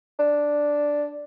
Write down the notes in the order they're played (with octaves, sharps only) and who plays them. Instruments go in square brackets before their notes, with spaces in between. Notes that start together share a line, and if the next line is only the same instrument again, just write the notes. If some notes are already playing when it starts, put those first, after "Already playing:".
[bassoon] D4